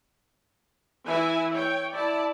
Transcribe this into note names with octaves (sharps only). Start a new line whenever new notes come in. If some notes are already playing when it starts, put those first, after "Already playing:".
E3 E4 E5 G#5
C#5 G5
E4 D5 A5